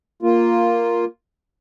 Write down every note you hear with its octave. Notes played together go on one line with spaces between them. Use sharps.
A#3 F4